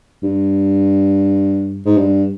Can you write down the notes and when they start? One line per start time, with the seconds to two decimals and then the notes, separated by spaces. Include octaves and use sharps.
0.23 G2
1.86 G#2
1.97 G2